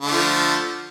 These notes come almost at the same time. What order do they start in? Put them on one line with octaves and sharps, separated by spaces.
D3 A3 F3